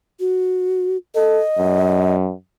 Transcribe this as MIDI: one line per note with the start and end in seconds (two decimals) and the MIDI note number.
0.20 0.97 66
1.15 1.43 69
1.15 2.15 75
1.58 2.33 42